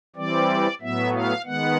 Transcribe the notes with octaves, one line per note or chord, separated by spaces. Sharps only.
E3 G3 C4 D5
A2 F#3 B3 E5
F5
D#3 G#3 B3 F#5